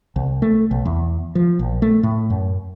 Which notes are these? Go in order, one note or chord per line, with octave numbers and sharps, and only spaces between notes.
C2
A3
B1
E2
F3
A#1
A3
A2
F#2